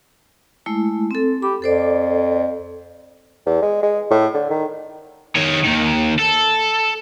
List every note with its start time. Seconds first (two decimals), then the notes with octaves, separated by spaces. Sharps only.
0.66 G#3 A3 E4
1.11 C4 A4
1.42 G4 B5
1.62 F2 A4 C5 D5
3.46 E2
3.62 G#3
3.83 G#3
4.11 A2
4.34 D3
4.50 D#3
5.35 D#3 C#5
5.64 D#2 D#3
6.19 A4